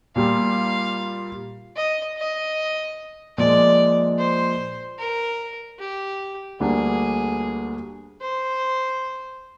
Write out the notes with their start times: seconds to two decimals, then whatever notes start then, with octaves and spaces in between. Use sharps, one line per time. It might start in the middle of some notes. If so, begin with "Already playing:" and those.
0.16 A#2 G3 A#3 F4 F5
1.76 D#5
2.17 D#5
3.37 A#2 F3 G#3 D5
4.19 C5
4.98 A#4
5.79 G4
6.60 D2 D3 G3 A#3 D4 G#4
8.21 C5